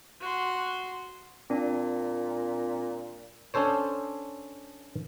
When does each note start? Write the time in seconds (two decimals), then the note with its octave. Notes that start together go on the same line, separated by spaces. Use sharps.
0.21 F#4 C6
1.50 A#2 C4 D4
3.54 C#4 D4 A4 C5 C#5